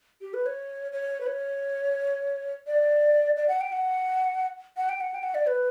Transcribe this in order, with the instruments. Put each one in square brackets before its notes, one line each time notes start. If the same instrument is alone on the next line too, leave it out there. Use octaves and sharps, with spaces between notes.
[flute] G4
B4
C#5
C#5
B4
C#5
D5
D5
F#5
G5
F#5
F#5
G5
F#5
G5
F#5
D5
B4